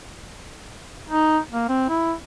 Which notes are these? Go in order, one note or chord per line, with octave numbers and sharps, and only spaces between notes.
D#4
A#3
C4
E4